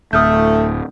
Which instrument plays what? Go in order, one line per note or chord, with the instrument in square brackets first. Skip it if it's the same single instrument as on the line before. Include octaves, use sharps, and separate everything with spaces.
[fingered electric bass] D1 [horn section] A3 [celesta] D#6 F6 G6